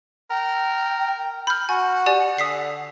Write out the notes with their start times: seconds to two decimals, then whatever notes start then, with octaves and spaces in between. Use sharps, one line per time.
0.30 A#4 G5
1.47 B5 F6 G6
1.69 F#4 F#5 G#5
2.06 G4 D5 G#5
2.38 D3 D#6 B6 C7